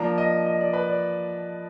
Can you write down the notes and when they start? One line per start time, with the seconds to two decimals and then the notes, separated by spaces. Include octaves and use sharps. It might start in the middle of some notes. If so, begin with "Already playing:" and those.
Already playing: F3 A#3 D4 A#5
0.18 D#5
0.46 D#5
0.61 D5
0.73 B4
0.88 D5